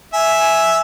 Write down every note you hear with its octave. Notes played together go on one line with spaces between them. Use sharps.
E5 G#5